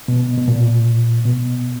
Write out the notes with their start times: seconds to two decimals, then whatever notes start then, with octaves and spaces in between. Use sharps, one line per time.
0.08 B2
0.38 B2
0.48 A#2
1.25 B2